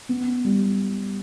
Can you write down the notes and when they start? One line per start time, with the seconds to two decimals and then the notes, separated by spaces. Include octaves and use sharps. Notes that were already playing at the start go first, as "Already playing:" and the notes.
0.09 B3
0.44 G3